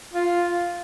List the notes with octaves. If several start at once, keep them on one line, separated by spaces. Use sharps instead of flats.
F4